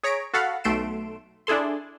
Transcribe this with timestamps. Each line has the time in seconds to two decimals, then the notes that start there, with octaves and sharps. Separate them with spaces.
0.03 G#4 C#5 A#5 B6 D7
0.34 F#4 A4 F5 F#5 B5
0.64 B1 A3 C6 D7 E7
1.47 D4 E4 G#4 A4 C6